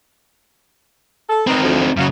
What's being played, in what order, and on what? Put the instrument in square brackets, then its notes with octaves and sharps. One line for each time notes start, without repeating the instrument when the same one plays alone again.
[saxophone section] A4
[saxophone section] D#3 B4 [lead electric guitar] C4 D#4
[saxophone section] D2 F3
[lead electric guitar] F#2 C#3 [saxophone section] F#3 F#4 F5